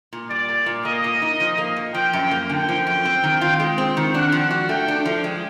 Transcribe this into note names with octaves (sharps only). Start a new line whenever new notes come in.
A#2
G3 D5
A#3
A#2
A#3 D#5
A#2
D#4
F3
A#3
A#2
F3 G5
F#2
A#3
D3 G5
F3
F#2
C4
D#3
F4
G#3
C4
D#3
D4 F#5
F3
F#4
A3 G5
D4
F3
G#3